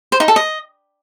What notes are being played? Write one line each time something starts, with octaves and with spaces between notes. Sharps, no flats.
C5
D#4
A4
D#5